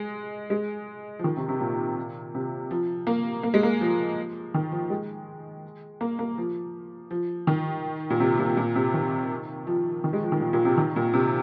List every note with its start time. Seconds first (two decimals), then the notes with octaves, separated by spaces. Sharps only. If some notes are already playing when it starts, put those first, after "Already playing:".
Already playing: G#3
0.50 G#3
1.19 F3
1.24 D#3
1.37 C3
1.49 C3
1.61 A#2
2.35 C3
2.71 F3
3.07 A#3
3.43 A#3
3.54 G#3
3.63 A#3
3.81 F3
4.54 D#3
4.72 F3
4.90 G#3
6.01 A#3
6.19 A#3
6.38 F3
7.11 F3
7.47 D#3
8.10 A#2
8.20 C3
8.39 A#2
8.57 A#2
8.75 C3
8.94 D#3
9.67 F3
10.04 D#3
10.13 G#3
10.23 F3
10.32 D#3
10.40 A#2
10.53 A#2
10.65 C3
10.77 D#3
10.96 A#2
11.14 C3